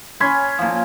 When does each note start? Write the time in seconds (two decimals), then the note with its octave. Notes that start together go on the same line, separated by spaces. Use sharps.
0.20 C#4 G#5 B5 C6
0.59 A#2 F3